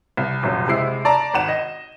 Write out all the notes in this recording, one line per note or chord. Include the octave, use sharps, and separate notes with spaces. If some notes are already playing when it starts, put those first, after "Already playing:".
C2
D#1 C2 F#2
C3 G#3 E4 C7
D5 A5 A#5
G#1 F#5 E7
D#5